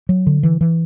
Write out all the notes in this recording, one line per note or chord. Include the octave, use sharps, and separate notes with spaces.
F#3
D3
E3
E3